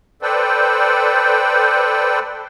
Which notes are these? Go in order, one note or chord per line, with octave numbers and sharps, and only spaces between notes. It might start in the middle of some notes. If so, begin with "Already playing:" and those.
A4 B4 C5 D5 G5